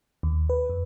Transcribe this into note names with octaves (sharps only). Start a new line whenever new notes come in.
D#2
B4
F2